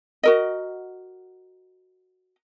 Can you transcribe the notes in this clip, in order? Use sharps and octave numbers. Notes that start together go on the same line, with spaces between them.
F#4 A#4 D#5